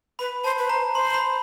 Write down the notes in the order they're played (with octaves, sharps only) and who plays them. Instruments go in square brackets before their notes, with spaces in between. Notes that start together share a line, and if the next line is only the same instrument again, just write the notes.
[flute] B4 [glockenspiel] B5
[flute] C5 [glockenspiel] A5
[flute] B4
[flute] C5 [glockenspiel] A#5
[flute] C5 [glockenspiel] C6
[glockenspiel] B5